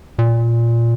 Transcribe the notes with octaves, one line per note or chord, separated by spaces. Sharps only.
A#2